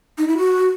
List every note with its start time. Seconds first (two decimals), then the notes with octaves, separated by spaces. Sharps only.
0.18 D#4
0.28 E4
0.38 F#4